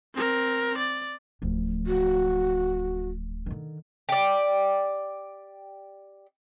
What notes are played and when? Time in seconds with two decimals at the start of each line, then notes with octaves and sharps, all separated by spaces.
0.15 C4 A#4
0.77 D5
1.42 D1 F3
1.87 F#4
3.46 D3 D#3
4.09 G4 D5